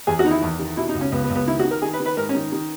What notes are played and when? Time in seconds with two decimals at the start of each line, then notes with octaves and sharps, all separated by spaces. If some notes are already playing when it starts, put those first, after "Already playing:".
0.07 E2 G#4
0.19 F#4
0.24 D#3 D#4
0.31 E4
0.42 E2
0.59 D#3
0.77 B2 E4
0.89 D#4
0.94 C#2
1.01 C#4
1.12 C#2 B3
1.24 B3
1.30 C#2
1.35 B3
1.47 D#3 E4
1.59 F#4
1.64 D#3
1.71 A#4
1.82 D#3 G#4
1.93 B4
2.00 D#3
2.06 B4
2.17 G#2 A#4
2.29 C#4
2.35 D#3
2.52 D#3